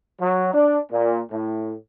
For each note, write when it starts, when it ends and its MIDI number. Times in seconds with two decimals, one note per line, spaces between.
0.19 0.50 54
0.53 0.79 62
0.91 1.20 46
1.31 1.73 45